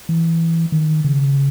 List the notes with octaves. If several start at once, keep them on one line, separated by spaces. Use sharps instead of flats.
E3
D#3
C#3